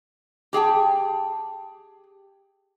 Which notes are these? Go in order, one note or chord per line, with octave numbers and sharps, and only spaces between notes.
G4 G#4 G5 A5